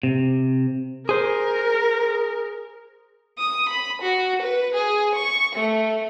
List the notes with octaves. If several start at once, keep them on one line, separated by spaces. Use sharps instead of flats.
C3
G#4 A#4 C5
D#6
B5
F#4
B4
G#4
C#6
A3